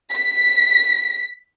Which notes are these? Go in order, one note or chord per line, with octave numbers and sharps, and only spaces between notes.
B6